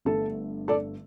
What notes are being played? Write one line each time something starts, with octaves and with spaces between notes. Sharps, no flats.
G1 G2 D3 A3 A4
A4 D5